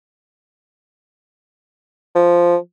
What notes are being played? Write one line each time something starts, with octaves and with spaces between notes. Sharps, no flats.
F3